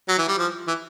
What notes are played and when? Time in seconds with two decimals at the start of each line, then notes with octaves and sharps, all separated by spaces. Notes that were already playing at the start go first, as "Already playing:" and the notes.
0.08 F#3
0.18 E3
0.28 G3
0.38 F3
0.68 E3